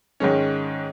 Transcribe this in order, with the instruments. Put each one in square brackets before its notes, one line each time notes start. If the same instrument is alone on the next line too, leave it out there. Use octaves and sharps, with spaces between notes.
[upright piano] G#2 D#3 G#3 C#4